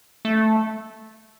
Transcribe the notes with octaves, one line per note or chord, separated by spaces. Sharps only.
A3